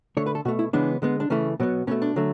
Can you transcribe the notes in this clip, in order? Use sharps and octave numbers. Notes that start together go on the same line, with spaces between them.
D3 A3 C#5
B4
A4
B2 A3 F#4
E4
C#3 E3 G#3 B3 D4
D3 G#3 B3
D4
C#3 E3 A3 C#4
B2 F#3 B3
B2 A3 C#4
D4
D3 F#3 A3